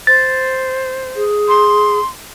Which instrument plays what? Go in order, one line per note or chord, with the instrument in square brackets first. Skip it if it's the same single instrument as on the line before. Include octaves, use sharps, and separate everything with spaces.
[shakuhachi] C5 [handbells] A6
[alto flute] G#4
[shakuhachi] C6